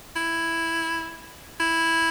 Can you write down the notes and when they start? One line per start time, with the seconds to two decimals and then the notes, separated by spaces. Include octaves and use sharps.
0.16 E4
1.60 E4